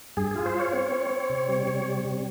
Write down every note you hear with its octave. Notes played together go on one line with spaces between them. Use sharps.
G2 G#4
F4 G#4
C5
F4 C#5
C4
C4
C4
C3
G3
C3
G3
C3